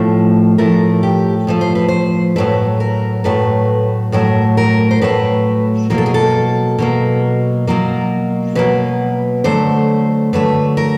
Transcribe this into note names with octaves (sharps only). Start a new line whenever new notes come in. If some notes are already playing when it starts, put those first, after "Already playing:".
Already playing: A2 F3 A3
A2 F3 A3 A#4
G4
A2 F3 A3
C5
B4
C5
A2 F#3 A3 B4
A#4
A2 F#3 A3 B4
A2 F#3 A3 A#4
A#4
C5
A2 F#3 A3 B4
B2 F#3 A#3 A#4
A4
G#4
A4
B2 F#3 A#3
B2 F#3 A#3 A#4
B2 F#3 A#3 B4
D3 F#3 A3 C5
D3 F#3 A3 B4
A#4